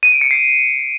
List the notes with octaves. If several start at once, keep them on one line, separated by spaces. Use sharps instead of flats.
D#7
D7
C#7
C7